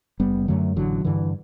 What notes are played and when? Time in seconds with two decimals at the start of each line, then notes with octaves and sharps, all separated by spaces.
0.20 F#1 G3 B3
0.48 F#2 D3 F#3 A3
0.76 A1 D3 F#3
1.04 G2 D3 E3